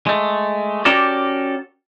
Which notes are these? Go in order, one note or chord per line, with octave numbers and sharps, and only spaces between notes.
G#3 A3
C#4 F#4 G4 A4 A#4 D5